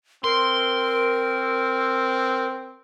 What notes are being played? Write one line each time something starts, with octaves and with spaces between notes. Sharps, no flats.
C4 A#4 C6